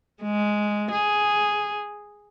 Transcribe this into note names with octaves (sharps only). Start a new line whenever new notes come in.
G#3
G#4